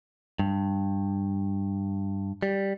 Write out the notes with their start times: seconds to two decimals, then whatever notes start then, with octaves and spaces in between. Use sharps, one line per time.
0.39 G2
2.43 G3